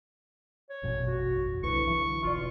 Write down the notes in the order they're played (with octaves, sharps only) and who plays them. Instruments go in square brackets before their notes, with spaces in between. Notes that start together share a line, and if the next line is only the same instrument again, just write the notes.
[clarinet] C#5
[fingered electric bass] E1 A1 F#2 [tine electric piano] B2
[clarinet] F#4
[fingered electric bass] C2 [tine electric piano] D3 E4 B4 [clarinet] C#6
[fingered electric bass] E3 F#3
[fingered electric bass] F1 B1 [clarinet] F4 [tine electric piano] D5 C#6